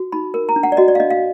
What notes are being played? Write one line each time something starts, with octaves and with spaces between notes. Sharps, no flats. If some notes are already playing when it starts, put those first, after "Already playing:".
Already playing: F#4
D#4 B5
A#4
A#5
D4
F#5
D5
F#4 D#5
D5
F5
D4 D#5
F5